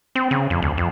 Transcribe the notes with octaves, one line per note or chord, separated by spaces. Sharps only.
C4
C#3
F2
D2
F2